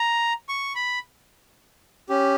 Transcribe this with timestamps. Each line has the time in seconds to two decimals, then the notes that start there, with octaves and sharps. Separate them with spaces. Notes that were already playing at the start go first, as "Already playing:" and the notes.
Already playing: A#5
0.49 C#6
0.75 B5
2.09 C#4 G4